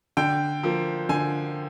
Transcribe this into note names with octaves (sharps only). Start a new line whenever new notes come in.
D3 G5
F3 A#3
D3 G#5